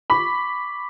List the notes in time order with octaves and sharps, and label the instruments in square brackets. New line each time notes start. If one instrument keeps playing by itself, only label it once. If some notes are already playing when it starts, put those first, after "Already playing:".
[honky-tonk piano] B5 [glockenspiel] C#6 D6 B6